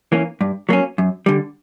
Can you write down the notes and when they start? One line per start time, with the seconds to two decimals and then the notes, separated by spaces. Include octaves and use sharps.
0.12 E3 A#3 C#4
0.41 G2
0.69 F#3 A#3 C#4
0.98 F#2
1.26 D3 G3